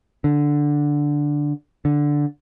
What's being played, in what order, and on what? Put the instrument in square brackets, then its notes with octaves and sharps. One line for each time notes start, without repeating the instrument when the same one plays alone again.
[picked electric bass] D3
D3